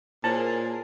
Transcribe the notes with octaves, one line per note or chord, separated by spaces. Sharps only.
A#2 E4 G#4 A#4 C5 C#5 A5